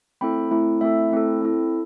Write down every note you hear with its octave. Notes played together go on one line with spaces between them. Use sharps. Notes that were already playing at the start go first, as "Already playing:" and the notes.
A3 C4 E4 A4 G5 B5
A3 C4 E4 A4
A3 C4 E4 A4 E5 G5
A3 C4 E4 A4
C4 E4 A4